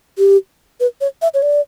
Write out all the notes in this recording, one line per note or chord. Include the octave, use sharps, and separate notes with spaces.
G4
B4
C#5
E5
C#5
D5